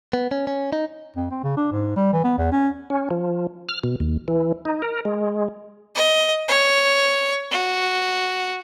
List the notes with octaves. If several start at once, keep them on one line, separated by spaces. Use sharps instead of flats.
B3
C#4
C#4
D#4
F2
C4
C#3
D4
G#2
G3
E3
B3
E2
C#4
C#4
F3
F6
B2
D#2
E3
D#4
A#4
G#3
D#5
C#5
F#4